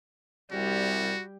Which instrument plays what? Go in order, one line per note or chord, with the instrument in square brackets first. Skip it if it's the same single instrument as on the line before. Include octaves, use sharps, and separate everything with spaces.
[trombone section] C2 C3 [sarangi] G3 [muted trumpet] F#4